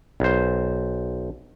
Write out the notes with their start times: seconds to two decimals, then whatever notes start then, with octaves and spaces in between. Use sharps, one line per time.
0.20 B1 C5